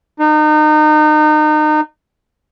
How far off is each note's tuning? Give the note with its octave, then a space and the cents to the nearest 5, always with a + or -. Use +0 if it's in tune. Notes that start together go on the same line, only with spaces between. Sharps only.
D#4 -30